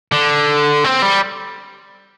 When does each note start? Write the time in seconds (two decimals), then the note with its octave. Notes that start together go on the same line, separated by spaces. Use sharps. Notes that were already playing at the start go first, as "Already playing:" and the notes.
0.12 D3
0.85 C4
1.02 G3